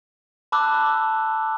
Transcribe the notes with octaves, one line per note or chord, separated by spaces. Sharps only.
A5 B5 D6 E6 F#6